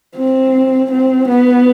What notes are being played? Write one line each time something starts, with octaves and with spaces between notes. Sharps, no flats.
C4
C4
B3